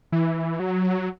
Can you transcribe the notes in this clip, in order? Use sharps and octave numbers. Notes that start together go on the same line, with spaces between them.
E3
F#3